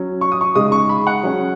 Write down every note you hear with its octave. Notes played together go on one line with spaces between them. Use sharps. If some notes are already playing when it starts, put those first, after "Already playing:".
Already playing: F#3 C#4
C#6
D#6
C#6
C#3 G#3 D#4 D#6
C#6
B5
F#5
F#3 C#4